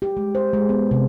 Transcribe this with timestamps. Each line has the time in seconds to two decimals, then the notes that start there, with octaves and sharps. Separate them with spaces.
0.02 G4
0.17 G#3
0.35 C5
0.53 G#3
0.69 B3
0.91 C3